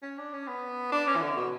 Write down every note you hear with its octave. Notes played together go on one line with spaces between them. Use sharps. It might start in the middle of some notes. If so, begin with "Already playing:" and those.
C#4
D4
C#4
B3
D4
C#4
E3
D3
B2